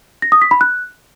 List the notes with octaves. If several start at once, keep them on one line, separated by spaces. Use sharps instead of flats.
A#6
D#6
B6
B5
F#6